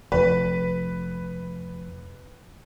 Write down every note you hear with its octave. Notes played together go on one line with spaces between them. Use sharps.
F1 F2 B4